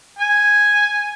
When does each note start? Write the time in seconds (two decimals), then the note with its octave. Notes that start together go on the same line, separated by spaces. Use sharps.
0.18 G#5